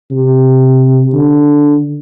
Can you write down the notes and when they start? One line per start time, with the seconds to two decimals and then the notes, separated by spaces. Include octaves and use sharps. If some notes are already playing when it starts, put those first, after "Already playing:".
0.11 C3
1.13 D3